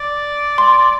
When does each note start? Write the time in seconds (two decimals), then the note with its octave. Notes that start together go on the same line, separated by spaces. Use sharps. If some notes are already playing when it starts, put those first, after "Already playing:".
Already playing: D5
0.58 C6